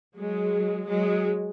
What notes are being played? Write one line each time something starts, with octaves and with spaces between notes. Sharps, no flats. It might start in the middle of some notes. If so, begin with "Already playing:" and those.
F#3 G#3
F#3 G#3